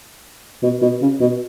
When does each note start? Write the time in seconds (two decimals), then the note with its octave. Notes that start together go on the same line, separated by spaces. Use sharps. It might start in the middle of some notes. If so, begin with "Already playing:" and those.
0.63 B2
0.82 B2
1.01 C#3
1.21 B2